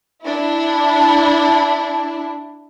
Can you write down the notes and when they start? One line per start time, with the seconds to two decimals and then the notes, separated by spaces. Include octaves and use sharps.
0.23 D4 E4